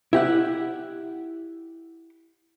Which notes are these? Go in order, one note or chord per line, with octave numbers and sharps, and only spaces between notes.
E4 G4 F#5